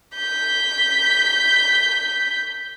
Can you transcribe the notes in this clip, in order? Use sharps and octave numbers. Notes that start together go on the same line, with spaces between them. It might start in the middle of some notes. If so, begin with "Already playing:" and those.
G6 B6